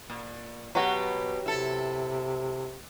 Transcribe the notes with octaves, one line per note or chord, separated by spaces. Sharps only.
A#2
B2 F#3 F#4 G4 B4
C3 E4 A4